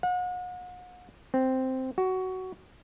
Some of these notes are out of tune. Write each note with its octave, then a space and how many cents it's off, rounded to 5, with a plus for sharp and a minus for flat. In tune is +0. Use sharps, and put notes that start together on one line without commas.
F#5 -40
C4 -5
F#4 +15